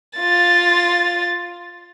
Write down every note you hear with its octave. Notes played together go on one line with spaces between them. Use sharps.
F4 A6